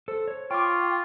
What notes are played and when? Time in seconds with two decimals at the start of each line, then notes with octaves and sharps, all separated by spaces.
0.08 A4 C5
0.28 C#5
0.51 F4 G5 C#6 D6